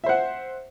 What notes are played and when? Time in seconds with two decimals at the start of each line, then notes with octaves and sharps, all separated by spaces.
0.04 E5
0.06 C5
0.09 F#5